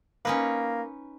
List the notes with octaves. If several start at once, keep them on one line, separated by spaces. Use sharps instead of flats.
A#3 C#4 D#4 B4